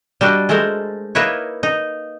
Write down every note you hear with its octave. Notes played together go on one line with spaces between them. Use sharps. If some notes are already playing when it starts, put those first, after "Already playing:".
G3 D4 F#4 D#5
G#3 A3 A4 A#4 C5
A#3 D#4 E4 A#4 B4 C#5
D#4